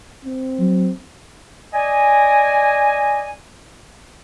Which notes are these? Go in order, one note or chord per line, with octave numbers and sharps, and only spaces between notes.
C4
F#3
D5 D#5 G#5